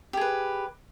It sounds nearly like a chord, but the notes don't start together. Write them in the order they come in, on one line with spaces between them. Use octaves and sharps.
G4 G#4 B4